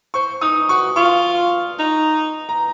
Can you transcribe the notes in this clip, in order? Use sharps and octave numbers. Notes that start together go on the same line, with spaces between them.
C5 C#6
D#4 D#6
F#4 C#6
F4 C#6
D#4
A#5